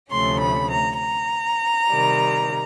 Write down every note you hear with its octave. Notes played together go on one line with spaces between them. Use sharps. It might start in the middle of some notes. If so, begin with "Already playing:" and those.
D2 C3 F3 A3 C#4 C6
B5
A#5
A#5
C3 D#3 G3